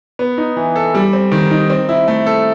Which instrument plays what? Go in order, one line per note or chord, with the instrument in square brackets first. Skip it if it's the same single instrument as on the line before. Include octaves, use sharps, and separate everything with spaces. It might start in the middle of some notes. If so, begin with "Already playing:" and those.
[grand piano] B3
D#4
E3
A4
G3
C4
D#3
D#4
C4
E4
A3
A4